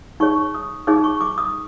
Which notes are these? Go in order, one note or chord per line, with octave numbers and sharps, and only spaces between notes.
D#4 G#4 C#5 C#6
D#6
D#4 G#4 C#5 D6
C#6
D6
D#6